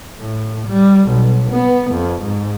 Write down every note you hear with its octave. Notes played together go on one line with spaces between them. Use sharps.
A2
G3
B1
B3
F2
G#2